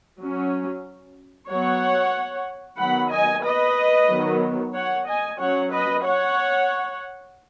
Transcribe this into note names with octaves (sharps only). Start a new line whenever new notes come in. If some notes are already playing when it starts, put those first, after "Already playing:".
F#3 C#4
F#3 B3 C#5 F#5
D#3 F#3 B3 F#5 B5
D#5 G#5
B4 D#5
D#3 F#3 B3
C#5 F#5
D#5 G#5
F#3 C#4 C#5 F#5
B4 D#5
C#5 F#5